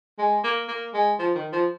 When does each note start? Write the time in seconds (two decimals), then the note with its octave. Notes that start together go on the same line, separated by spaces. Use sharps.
0.19 G#3
0.44 A#3
0.68 A#3
0.94 G#3
1.19 F3
1.35 D#3
1.53 F3